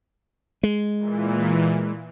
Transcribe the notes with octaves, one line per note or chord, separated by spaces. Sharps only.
G#3
A#2 E3